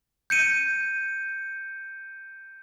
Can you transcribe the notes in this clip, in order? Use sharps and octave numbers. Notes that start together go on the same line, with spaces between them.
G6 C#7 D#7